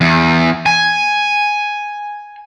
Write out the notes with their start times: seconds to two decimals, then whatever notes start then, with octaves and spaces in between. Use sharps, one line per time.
0.01 E2
0.66 G#5